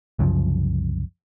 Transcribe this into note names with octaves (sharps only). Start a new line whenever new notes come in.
C2 F#2 C#3 F3